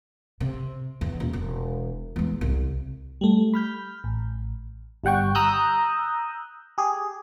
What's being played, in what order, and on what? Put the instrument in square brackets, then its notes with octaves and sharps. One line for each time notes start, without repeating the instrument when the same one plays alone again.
[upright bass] C3
E2
D#1
E1
E2 G#3
C2
[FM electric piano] G3 A3
B5 F6 G6
A1
G1 G3 F#5 G5 C#6
A#5 D#6 E6 F#6 G6
G4 G#4